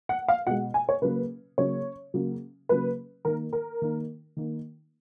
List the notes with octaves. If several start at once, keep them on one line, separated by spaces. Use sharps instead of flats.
F#5
F5
B2 G#3 F#5
G#5
C#5
C#3 F#3 A#3 B4
C#3 F#3 A#3 C#5
C#3 F#3 A#3
C#3 F#3 A#3 B4
D#3 A#3 A#4
A#4
D#3 A#3
D#3 A#3